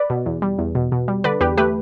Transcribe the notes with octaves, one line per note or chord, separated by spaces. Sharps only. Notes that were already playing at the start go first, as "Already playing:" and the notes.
Already playing: B4 D5
B2
E2
G3
E2
B2
B2
G3
D3 B4 D5
E2 G4 B4
A3 G4 B4